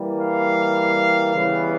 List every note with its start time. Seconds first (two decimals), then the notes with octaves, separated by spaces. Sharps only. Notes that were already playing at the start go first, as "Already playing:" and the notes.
Already playing: E3 G3 A#3
0.21 F5
1.34 C#3 E3 G3 B3